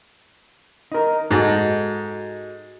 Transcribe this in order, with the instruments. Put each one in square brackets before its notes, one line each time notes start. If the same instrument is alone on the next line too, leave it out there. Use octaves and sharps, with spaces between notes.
[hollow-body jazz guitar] D#4 A#4
[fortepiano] G#2 [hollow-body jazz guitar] D#4 F#4 A4